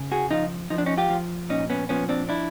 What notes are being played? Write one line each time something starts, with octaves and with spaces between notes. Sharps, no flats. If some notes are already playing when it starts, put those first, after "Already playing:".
Already playing: C#3
F#4 G#4
F3 D#4 F4
F3 D#4
D4
C#4 D#4
F4 G4
F3
A#2 C#4 D#4
B3 C#4
F3 B3 C#4
C4 D4
D4 E4